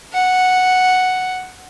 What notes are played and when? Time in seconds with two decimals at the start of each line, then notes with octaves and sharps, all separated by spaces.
0.13 F#5